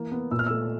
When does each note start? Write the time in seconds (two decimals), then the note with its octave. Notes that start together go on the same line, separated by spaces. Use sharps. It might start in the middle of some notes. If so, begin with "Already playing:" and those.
Already playing: E3 A#3
0.12 B3
0.31 A#2 E6
0.39 F6
0.46 A3 E6